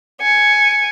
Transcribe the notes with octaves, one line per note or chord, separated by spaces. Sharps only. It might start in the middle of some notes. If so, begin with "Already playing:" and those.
G#5 C#7